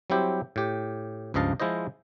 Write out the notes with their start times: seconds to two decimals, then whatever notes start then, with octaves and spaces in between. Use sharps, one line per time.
0.10 F#3 G3 C4 E4 G4 C5
0.56 A2 G4
1.34 C#2 G2 F3 D#5 F5 A5
1.60 F3 G#3 E4 F4 C5 D#5